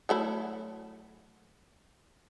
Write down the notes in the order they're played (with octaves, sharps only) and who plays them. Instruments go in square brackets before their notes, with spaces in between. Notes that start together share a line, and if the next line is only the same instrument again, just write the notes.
[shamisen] F#3 A3 E4